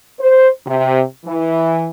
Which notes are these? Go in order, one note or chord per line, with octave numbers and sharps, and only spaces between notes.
C5
C3
E3